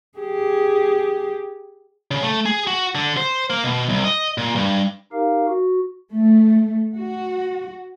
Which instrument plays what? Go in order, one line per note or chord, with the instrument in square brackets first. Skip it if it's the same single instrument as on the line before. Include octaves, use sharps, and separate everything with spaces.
[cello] G4 G#4
[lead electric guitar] C#3
A3
G#4
F#4
D3
C5
A#3
B2
C2
D#5
A#2
G2
[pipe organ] D#4 G4 A#4 F5
F#4
[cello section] A3
F#4